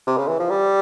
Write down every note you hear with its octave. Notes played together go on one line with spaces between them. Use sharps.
C3
C#3
E3
F3
G3